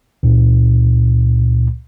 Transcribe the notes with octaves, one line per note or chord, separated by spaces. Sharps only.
C#2 A#2